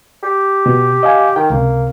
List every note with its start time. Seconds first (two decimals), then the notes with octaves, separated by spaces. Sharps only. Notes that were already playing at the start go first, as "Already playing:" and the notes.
0.23 G4
0.66 B2
1.03 D#5 F5 G#5
1.36 D#3 G5
1.50 C#2 C3 A#3